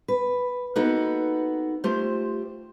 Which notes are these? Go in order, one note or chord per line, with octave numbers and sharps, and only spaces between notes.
B4
A#3 B3 D#4 F#4 A4 B4
A3 F4 G4 C5